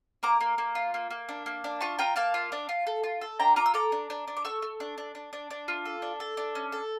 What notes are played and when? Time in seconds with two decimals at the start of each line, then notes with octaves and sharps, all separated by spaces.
0.23 A#3 A#5 D6
0.41 A#3
0.58 A#3
0.75 F4
0.94 A#3
1.10 A#3
1.29 D4
1.46 A#3
1.64 D4
1.81 F4 A5 C#6
1.99 F4 G5 A#5
2.16 A#3 F5 A5
2.34 F4
2.52 D4
2.69 F4
2.87 A4
3.04 F4
3.21 A4
3.39 D4 G5 A#5
3.56 F4 A#5 D6
3.66 E6
3.74 A4 A#5 D6
3.92 D4
4.10 D4
4.27 D4
4.37 D6
4.45 A4 C#6 E6
4.62 A4
4.80 D4
4.98 D4
5.15 D4
5.33 D4
5.50 D4
5.68 F4
5.85 A4
6.02 D4
6.20 A4
6.37 D4
6.55 C#4
6.72 A4